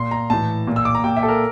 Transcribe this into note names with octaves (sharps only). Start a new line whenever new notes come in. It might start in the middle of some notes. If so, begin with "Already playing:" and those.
Already playing: A#2 C6
A#5
A2 E3 A5
A#2
E6
D6
A#5
A#2 G5
E5
A4
A#4